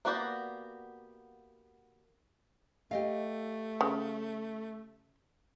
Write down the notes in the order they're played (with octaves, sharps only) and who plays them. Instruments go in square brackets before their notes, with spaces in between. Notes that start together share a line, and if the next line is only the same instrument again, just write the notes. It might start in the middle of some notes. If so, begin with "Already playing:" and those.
[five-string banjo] A#3 B3 F#4 G4 D5
[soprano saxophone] A3 [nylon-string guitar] G4 D#5 F5
[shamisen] C#3